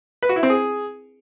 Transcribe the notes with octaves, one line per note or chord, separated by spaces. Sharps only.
B4
F#4
E4
C4
G#4